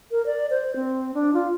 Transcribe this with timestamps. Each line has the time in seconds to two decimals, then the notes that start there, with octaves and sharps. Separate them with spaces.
0.11 A#4
0.26 D5
0.50 C5
0.76 C4
1.14 D4
1.34 F4